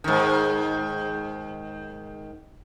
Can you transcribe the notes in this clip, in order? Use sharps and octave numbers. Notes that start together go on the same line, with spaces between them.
G#2 D#3